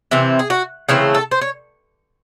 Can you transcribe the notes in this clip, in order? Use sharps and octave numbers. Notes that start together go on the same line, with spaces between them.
C3 E3 C4
G#4
F#4
C#3 E3 A3 C4 G#4
A4
C5
C#5